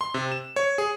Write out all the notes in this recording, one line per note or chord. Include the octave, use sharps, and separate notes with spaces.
C6
C3
E7
C#5
G#4